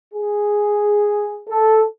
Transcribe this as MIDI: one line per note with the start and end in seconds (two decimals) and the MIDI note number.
0.14 1.41 68
1.49 1.82 69